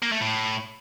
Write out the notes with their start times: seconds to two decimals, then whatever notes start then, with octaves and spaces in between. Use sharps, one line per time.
0.02 A#3
0.12 A3
0.21 A2